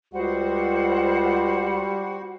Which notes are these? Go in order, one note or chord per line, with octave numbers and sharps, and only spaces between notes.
C#2 G3 F#4 C5 F#5